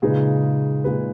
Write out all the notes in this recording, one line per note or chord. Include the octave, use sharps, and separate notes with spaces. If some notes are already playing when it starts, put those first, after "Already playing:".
A#2 C#3 G#3 D#4 G#4 B4
A#2 G#3 D#4 G#4 B4